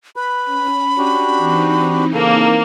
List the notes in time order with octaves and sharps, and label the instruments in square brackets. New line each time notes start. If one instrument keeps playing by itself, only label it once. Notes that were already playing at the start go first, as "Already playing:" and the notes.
[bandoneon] B4 [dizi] B5
[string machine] C#4
[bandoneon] D4 F#4 G4
[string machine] E3 C4 D#4
[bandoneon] C#3 A4 [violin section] A#3